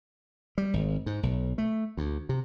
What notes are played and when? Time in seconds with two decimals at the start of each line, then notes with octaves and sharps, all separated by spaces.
0.58 G3
0.74 G#1
1.06 G#2
1.23 B1
1.58 A3
1.97 D2
2.29 C3